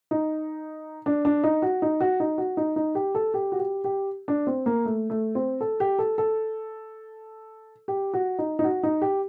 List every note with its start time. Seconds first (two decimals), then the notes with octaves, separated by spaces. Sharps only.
0.11 D#4
1.06 D4
1.25 D4
1.44 D#4
1.62 F#4
1.82 D#4
2.00 F#4
2.20 D#4
2.38 F#4
2.57 D#4
2.76 D#4
2.95 G4
3.15 A4
3.34 G4
3.52 F#4
3.59 G4
3.84 G4
4.28 D4
4.47 C4
4.66 A#3
4.85 A3
5.10 A3
5.35 C4
5.61 A4
5.80 G4
5.99 A4
6.18 A4
7.88 G4
8.14 F#4
8.39 D#4
8.59 D#4
8.64 F#4
8.83 D#4
9.02 G4